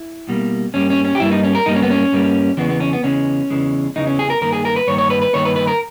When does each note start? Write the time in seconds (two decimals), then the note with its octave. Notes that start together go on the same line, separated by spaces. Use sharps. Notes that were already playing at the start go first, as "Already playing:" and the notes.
Already playing: E4
0.29 B2 G3 A#3
0.74 G2 G3 A#3 C#4
0.90 C#4
1.05 C#4
1.15 G4
1.20 G2 G3 A#3 E4
1.31 D#4
1.43 C#4
1.55 A#4
1.66 G2 G3 A#3 D#4
1.75 C#4
1.83 B3
1.90 C#4
2.12 G2 G3 A#3
2.57 E2 C#3 E3 G#3 B3
2.69 B3
2.80 C#4
2.93 B3
3.03 E2 C#3 E3 G#3 C#4
3.50 E2 C#3 E3 G#3
3.96 E2 C#3 E3 G#3 D#4
4.07 C#4
4.19 G#4
4.30 A#4
4.41 G2 D#3 A#3 A#4
4.52 G#4
4.65 A#4
4.76 B4
4.88 G2 D#3 A#3 C#5
4.98 C#5
5.10 B4
5.22 B4
5.33 G2 D#3 A#3 C#5
5.45 B4
5.56 B4
5.67 A#4